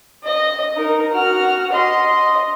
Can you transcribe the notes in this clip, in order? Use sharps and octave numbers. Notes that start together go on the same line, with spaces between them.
D#5
D#4 A#4
F#4 F6
D#5 C6